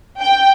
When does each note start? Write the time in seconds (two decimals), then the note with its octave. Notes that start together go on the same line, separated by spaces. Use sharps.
0.20 G5